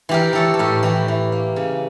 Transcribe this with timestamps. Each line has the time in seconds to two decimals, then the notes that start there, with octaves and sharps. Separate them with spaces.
0.09 E3 G4 A#4
0.33 E3 A4 C#5
0.54 A4
0.59 A2 G4 A#4
0.83 E3 E4 G4
1.08 E3
1.32 A#3
1.56 C#3